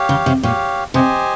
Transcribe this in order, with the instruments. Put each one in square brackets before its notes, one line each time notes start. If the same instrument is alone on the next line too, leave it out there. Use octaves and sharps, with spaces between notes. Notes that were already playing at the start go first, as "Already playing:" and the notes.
Already playing: [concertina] G4 C#5 F5
[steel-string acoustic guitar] C#3
C3
[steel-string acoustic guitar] A#2 [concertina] G4 C#5 F5
[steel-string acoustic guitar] C3 [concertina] G4 C5 D#5 G#5